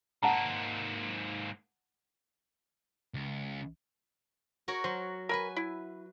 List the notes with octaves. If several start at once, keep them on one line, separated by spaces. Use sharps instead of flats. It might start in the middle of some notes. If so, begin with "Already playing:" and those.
G#2 A#3 F#5 A5 A#5
C#2
F#4 A#4 C#5
F#3 C5
A#4 B4 G#5 B5
E4